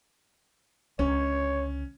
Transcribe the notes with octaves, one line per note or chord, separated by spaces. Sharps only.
C#2 D3 C#4 C#5